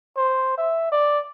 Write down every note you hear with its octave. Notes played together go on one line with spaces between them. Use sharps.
C5
E5
D5